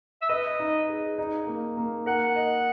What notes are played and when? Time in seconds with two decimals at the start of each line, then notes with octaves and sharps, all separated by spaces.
0.22 E5
0.29 B4 D#5
0.59 D#4
0.89 G#4
1.18 D#4
1.47 A#3
1.77 A#3
2.06 A#4 F#5
2.36 D#5